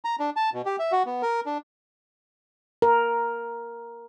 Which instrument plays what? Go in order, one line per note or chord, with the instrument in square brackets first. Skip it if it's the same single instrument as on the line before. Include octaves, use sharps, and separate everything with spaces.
[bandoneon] A#5
D4
A5
B2
G4
E5
F#4
B3
A#4
D4
[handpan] A#4